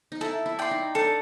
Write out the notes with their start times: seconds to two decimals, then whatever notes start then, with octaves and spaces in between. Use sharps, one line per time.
0.12 D#4
0.21 E4 A4
0.46 E4
0.59 D5 G5 C6
0.71 D#4
0.95 D4 A4